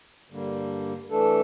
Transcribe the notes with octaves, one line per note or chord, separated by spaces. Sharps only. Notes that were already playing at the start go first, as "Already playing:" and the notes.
G2 D3 G3 A#3
E3 A3 D4 A4